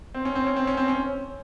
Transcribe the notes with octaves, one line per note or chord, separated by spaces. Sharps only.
C4
C#4
C4
C#4
C4
C#4
C4
C#4